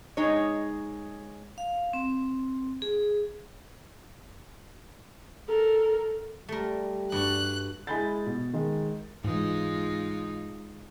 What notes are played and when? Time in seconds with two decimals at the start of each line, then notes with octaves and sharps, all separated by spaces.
0.17 G#3 D#4 C#5
1.58 F5
1.93 C4
2.82 G#4
5.47 A4 A#4
6.49 G3 A3 A#4
7.12 G2 F#4 F#6
7.87 G#3 E4 G#5 B5 G6 A6
8.26 B2
8.53 D#3 G#3
9.24 G#2 E3 G#3 D#4 F4